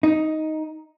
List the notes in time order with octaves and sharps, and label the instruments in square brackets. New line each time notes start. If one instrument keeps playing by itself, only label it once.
[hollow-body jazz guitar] D#4